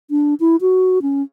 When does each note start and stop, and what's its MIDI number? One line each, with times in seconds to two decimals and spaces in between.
0.10 0.34 62
0.40 0.56 64
0.61 1.02 66
1.02 1.22 61